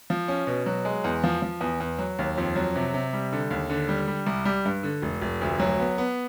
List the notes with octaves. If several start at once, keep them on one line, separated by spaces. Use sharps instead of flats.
F3
C#4
B2
F#3
G#3
E2
F3
F3
E2
E2
F#3
D#2
F2
F#3
C3
C3
G3
D3
D#2
D3
G3
G3
C2
G3
G2
D3
F1
F1
D2
F#3
B3
B3